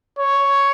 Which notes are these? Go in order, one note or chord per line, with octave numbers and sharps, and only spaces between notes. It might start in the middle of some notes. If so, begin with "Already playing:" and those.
C#5